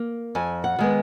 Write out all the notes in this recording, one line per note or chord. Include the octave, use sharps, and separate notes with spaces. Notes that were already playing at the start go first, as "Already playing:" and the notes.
Already playing: A#3
F2 G#5
F#5
D#3 G#3 B3